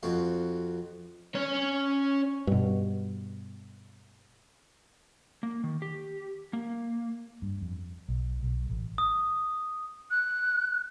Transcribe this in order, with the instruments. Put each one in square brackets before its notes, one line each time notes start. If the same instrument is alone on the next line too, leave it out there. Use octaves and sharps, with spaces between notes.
[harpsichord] F2 C4 F#4 F5
[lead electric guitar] C#4 C#5
[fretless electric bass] G2 B2
[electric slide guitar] A#3
D#3
G4
A#3
[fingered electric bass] G2
F2
B1
B1
A1
[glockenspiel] D#6
[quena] F#6